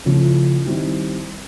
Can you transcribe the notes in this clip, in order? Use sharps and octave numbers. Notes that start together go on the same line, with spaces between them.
C#3 F3 A3 C#4 E4
D#3 G3 C4 E4